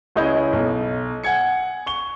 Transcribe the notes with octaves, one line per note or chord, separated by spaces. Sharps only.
C#2 C#4 E4 G#4 D#5 G6
B1
F#5 G#5 G#6 C#7
C#6 G7